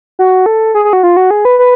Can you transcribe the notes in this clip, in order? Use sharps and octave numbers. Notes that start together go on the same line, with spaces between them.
F#4
A4
G#4
G#4
F#4
F4
F#4
G#4
B4
B4